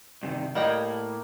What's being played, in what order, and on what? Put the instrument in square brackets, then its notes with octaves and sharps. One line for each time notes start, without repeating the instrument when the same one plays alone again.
[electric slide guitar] G2 C3 D#3
[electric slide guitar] A2 [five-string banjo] G3 D#5 G5 [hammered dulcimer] A#3